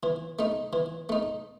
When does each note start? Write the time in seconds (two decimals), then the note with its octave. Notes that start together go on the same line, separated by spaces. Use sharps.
0.03 E3
0.39 A3 D#4
0.73 E3
1.09 A3 D#4